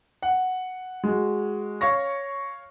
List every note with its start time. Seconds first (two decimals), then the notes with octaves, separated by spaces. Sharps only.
0.22 F#5
1.04 G#3 F#4
1.81 C#5 F5 C#6 A#6